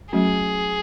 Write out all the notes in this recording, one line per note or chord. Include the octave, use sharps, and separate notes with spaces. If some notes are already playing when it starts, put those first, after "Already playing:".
F#3 A3 C#4 F#4 G#4